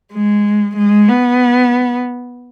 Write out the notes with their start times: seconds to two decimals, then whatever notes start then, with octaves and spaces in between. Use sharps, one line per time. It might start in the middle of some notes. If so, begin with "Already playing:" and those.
0.13 G#3
0.77 G#3
1.08 B3